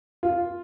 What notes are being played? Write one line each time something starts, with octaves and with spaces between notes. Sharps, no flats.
F4